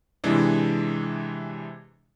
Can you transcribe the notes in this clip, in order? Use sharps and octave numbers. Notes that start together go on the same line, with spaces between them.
C3 E3 G#3 D4